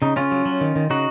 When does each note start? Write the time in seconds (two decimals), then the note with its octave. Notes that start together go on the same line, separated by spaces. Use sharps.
0.02 C#3 D#4
0.16 C#3 C#4 F4
0.31 F#3
0.45 F#3
0.61 D#3
0.76 D#3
0.90 C#3 D#4 F#4